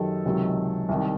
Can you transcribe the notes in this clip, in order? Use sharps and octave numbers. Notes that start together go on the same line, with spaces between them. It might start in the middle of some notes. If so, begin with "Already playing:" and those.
Already playing: F#2 D#3 F#3 G4 A4
C#2 C3 D#3 F#3
C2 C3 D#3